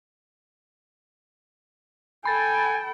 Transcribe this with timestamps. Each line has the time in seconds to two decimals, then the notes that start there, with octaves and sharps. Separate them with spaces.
2.25 A4 G5 G#5 B5 A6